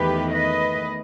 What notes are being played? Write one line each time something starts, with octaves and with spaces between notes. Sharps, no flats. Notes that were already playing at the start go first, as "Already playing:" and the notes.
Already playing: E2 D#3 A3 G4 B4
B4 D#5